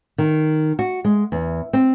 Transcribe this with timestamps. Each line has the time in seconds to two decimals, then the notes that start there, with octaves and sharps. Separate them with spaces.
0.18 D#3
0.79 F#4
1.05 G#3
1.32 E2
1.73 C4